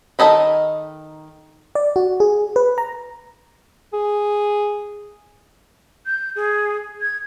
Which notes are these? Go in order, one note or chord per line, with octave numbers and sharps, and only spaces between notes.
D#3 A#3 A4 D#5 B5
D5
F#4
G#4
B4
A#5
G#4
G6
G#4
G#6